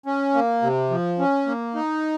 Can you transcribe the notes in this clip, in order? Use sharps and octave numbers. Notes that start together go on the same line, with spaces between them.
C#4
A#3
C3
F3
C#4
A#3
D#4